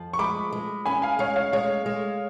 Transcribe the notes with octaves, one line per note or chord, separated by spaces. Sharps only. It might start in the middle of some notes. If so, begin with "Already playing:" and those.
Already playing: F2 F3
C#6
G#3 B5 D6
G#3
C#4 G#5 B5
F5 G#5
G#3 C#5 F5
C#5 F5
G#3 C#5 F5
G#3